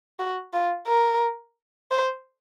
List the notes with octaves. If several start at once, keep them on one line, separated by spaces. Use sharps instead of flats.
F#4
F4
A#4
C5